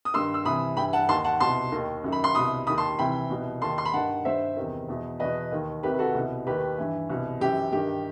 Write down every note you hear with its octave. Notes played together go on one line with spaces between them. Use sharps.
D#6
G2 D#3 C6 E6
E6
C2 C3 E3 B5 D#6
G2 E3 G5 B5
F#5 A5
D#2 D#3 A5 C6
F#5 A5
C2 B2 A5 C6
D#2 D#3
F#2 D#3
B5
C6
C2 B2 B5 D#6
D#2 D#3 B5 D#6
A5 C6
C2 C3 E3 G5 B5
C2 B2
D#2 D#3 A5 C6
C6
B5
G2 D#3 F#5 A5
G2 D#3 C5 E5
E2 C3 D#3
E2 B2
E2 B2 B4 D#5
D#2 D#3
C2 C3 D#3 G4 B4
B4
F#4 A4
C2 B2
D#2 D#3 G4 B4
G2 E3
C2 B2
F#2 E3 G4
G2 D#3 G4